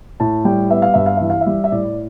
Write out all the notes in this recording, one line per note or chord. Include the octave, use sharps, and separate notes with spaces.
A2 A5
G3 G5
B3 E5
F5
G2 E5
F5
E3 E5
F5
E5
G3
E5
A2 D5